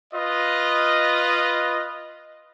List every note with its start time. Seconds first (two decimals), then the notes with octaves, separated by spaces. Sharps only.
0.13 F4 B4 D#5